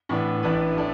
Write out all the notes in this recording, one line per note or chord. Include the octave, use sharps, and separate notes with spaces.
A2 E3 B3 D4
A1 A2 E3 D4 B4
A2 A3 D4